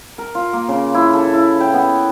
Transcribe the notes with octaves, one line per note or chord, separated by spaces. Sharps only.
A#4
F4
A#3
C#3
E4
A4
E4
G5
B3